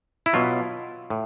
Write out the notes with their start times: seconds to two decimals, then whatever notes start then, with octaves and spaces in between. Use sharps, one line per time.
0.26 E4
0.33 B2 F#3 F4
1.10 A2